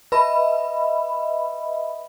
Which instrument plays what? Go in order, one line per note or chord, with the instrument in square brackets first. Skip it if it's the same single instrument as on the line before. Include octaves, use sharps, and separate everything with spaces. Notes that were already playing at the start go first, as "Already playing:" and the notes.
[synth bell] B4 B5 [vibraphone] D#5 E5